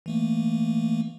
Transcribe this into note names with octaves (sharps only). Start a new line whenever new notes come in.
E3 A3 A#3